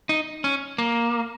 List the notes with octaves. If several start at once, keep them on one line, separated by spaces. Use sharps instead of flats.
D#4
C#4
A#3